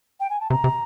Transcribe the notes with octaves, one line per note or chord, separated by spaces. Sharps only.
G5
G#5
A5
C3 A#5
C3